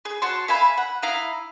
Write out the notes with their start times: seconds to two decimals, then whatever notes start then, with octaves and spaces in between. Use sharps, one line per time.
0.05 G#4
0.22 F#4 C#5 A5 C6
0.48 E5 F5 G#5 B5
0.78 F#5
1.02 E4 F5 A#5 D#6